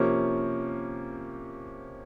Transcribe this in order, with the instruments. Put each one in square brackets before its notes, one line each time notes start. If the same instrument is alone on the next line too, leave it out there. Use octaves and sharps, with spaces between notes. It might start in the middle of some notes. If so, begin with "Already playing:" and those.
Already playing: [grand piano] C3 F3 A#3 C#4